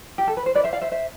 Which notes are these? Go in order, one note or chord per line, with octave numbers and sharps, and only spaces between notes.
G4
A4
B4
C5
B4 D5
C5 E5
D5 F5
C5 E5
C5 E5